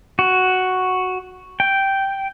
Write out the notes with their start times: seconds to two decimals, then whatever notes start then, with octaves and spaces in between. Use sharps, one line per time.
0.19 F#4
1.60 G5